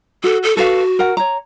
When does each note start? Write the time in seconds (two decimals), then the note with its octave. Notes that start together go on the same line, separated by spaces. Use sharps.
0.24 F#4 A4
0.43 A4
0.57 F#4 A4 B4 F5
0.99 A#4 F#5
1.17 C#5 A#5